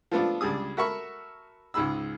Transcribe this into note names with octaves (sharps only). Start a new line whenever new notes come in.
F3 A3 B3 D4 F4
C#2 G3 D4 G#4 D#6
F#4 A4 A#4 E5 B5 C#6
C#2 G#2 G#4 B5 E6